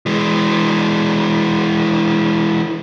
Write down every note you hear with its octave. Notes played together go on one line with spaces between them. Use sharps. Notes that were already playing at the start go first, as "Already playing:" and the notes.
E3 G#3